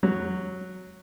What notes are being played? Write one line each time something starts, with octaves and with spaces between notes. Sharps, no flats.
F#3